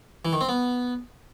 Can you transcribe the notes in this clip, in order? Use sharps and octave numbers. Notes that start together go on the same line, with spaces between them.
E3
D#3
C4
B3